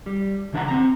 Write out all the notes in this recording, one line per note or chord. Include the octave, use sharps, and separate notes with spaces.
G3
C#3 E3 D4 B4 F#5 A#5
C4 A#5